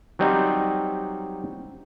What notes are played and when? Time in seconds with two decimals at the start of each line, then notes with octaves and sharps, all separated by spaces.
0.19 F#3 G3 C4 D#4